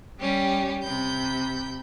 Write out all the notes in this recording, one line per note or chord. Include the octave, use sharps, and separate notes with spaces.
G3 C#4 G4
C3 B5 G6